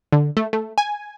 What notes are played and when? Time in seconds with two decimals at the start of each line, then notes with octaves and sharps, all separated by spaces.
0.12 D3
0.37 A3
0.53 A3
0.78 G#5